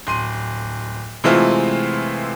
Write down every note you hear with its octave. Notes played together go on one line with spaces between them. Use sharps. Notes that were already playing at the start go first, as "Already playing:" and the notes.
D1 C6 D#7
C3 E3 G#3 A3 C4 F4